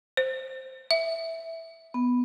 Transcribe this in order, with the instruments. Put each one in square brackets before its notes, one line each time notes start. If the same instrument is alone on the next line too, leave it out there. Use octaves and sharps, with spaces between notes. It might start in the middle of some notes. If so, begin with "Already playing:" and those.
[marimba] C5
E5
[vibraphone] B3